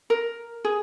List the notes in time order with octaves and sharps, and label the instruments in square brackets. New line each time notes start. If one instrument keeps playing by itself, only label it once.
[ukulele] A#4
G#4